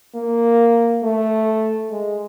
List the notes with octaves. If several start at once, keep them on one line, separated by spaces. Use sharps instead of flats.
A#3
A3
G#3